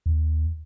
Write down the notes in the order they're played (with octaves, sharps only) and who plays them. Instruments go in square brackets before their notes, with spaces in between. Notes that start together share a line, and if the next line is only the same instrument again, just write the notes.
[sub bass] D#2